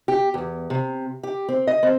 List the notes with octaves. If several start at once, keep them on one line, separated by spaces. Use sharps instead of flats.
G4
E2
C3
G4
C4
D#5
C4